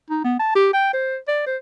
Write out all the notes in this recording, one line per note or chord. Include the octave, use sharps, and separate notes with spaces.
D#4
B3
A5
G4
G5
C5
D5
C5